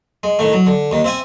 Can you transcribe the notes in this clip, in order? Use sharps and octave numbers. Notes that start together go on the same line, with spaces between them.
G#3
A2 D#3 A3
F#3
D3
D#2 D#3
C4 E5 G#5